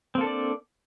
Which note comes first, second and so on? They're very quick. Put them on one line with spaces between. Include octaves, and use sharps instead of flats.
C4 A#3 A4 D4 D5